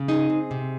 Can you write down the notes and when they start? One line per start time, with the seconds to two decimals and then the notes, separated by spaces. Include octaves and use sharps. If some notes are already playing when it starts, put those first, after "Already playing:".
Already playing: C#3
0.08 D#4 G#4
0.30 C4
0.51 C3